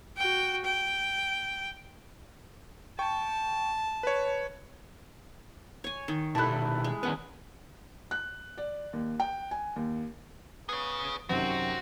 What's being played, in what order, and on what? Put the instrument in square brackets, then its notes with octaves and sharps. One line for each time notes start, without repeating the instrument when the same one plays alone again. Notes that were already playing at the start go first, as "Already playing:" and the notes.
[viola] F#4 G5
G5
[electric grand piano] G5 C#6 [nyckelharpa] A5
[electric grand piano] B4 C#5
[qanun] C#5 G#5
D#3
[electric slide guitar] B2 D#3 G4 [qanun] E4 A4 [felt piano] A5 B5 F#6
[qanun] G#3
[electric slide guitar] D#3 B3 B4 [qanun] C#4
[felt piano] F#6
D5
D#2
G5
G#5
D#2
[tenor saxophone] B3 [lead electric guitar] G#4 C#5
[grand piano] F#2 C3 D#3 [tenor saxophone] C4 [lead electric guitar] F#4